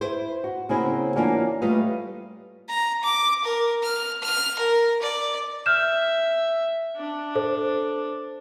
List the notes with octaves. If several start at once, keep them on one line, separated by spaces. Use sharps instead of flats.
E4 B4 C5
F#4
C#3 A#3 C4 C#4 E4 F#4
E3 A#3 C#4 D4 F4 F#4
G3 A3 F4 B4 D#5 F5
A#5
D6
A#4
F6
F6
A#4
D5
E5 F6 G6 E7
D4
A4 C5